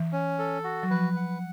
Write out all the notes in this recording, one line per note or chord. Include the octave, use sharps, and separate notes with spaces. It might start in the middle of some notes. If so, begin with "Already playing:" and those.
Already playing: E3
C#4
A4
F#4
F#3
F3 B4
F#5